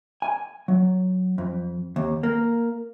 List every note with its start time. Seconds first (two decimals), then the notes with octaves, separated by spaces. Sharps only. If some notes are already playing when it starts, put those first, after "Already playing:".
0.22 G#5
0.68 F#3
1.38 F2
1.96 D#2
2.23 A#3